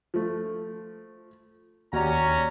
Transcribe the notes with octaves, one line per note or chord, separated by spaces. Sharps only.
F3 A3
D#2 C#4 F#4 G4 D5 A#5